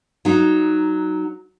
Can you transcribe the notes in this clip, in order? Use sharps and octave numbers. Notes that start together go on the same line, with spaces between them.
F#3 D#4